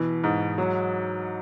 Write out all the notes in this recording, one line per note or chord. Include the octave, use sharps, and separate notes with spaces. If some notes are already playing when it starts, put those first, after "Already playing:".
Already playing: B2 E3
G#2
F#3